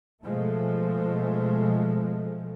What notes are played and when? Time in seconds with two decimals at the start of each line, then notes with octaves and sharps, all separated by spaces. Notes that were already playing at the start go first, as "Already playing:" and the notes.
0.22 B2 F3 G#3 A3